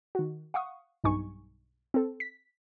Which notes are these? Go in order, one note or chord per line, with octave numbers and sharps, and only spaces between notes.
D#3 F#4
F5 F#5 C#6 D#6
B1 G2 D#4 G#5 C#6
C4 A4
B6